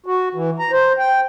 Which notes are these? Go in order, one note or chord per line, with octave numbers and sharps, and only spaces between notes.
F#4
E3
A#5
C5
G5